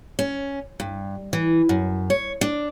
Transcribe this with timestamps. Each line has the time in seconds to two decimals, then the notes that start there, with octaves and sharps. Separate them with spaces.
0.19 C#4
0.80 G2
1.33 E3
1.69 F#2
2.10 C#5
2.41 D4